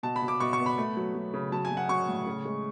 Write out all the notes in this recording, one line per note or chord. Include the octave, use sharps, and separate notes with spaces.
B2 A5
B5
B2
D6
B2 C#6
C#6
B3
B5
A3
F#3
F#3
C#3
F#3 A5
G#5
F#3
F#5
F#3 C#6
A2
C#3
G#3